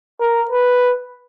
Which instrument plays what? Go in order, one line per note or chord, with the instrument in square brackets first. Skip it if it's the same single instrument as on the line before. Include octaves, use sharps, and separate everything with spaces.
[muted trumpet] A#4
B4